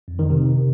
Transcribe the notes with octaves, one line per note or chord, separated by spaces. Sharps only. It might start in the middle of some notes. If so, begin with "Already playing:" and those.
F2
D#3
C3